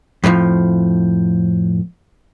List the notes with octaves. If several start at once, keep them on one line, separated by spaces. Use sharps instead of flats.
F2 A2 D#3 F3